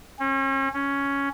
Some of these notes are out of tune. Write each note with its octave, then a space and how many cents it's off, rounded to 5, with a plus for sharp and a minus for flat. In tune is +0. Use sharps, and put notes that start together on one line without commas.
C#4 -40
C#4 +5